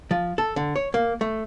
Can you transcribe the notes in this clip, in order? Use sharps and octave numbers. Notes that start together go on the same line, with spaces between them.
F3
A4
D3
C#5
A#3
A3